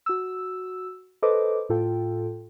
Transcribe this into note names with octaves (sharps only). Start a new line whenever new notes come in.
F#4 E6
A4 B4 C5 D#5 D6
A2 F4 A4 G5